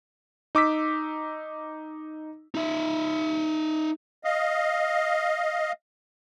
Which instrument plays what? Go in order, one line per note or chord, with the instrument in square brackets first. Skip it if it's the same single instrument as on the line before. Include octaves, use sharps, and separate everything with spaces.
[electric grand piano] D#4 D6 E6 B6
[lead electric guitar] D#4 E5
[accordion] D#5 F5